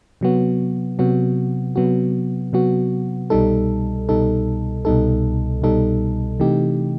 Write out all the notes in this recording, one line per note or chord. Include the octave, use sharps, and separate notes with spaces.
C3 F#3 B3 F#4
C3 F#3 B3 F#4
C3 F#3 B3 F#4
C3 F#3 B3 F#4
C2 B2 G3 D#4 A4
C2 B2 G3 D#4 A4
C2 B2 G3 D#4 A4
C2 B2 G3 D#4 A4
C3 E3 A3 D#4 G4